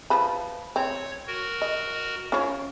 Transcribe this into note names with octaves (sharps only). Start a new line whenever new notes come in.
F3 B4 B5
C4 C#5
F#4 A#4
D#5
C#4 F4 C#5